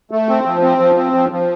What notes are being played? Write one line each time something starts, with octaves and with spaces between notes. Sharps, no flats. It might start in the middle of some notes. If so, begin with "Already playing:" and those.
A3
C4
F3
C4
F3
C4
F3
F3